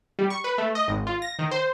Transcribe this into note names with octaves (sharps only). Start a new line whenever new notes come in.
G3
C#6
B4
A3
D#5
G#1
F4
A#6
D#3
C5